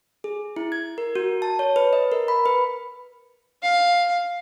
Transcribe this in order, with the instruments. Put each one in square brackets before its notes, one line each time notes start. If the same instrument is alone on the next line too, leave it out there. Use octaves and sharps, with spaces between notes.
[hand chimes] G#4
E4
G#6
A#4
F#4
A5
C#5
B4
D#5
A#4
B5
B4
[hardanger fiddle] F5